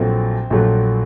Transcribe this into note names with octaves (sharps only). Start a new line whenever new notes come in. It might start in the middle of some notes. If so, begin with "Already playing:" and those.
Already playing: A#1 A#2 F#3 A3 C4
A#1 A#2 F#3 A3